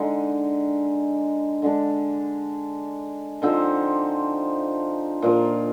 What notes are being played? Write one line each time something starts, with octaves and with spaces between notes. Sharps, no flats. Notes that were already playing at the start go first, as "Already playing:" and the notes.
Already playing: D3 G#3 D#4
D3 G#3 D4
D3 F3 C4 D#4
A#2 F3 A#3